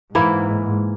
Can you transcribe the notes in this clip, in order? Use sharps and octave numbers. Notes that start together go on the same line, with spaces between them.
G#2 E3 A#3 E4